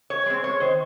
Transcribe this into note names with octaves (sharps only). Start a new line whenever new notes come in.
C#5
G#3 C4
C#5
D#3 C5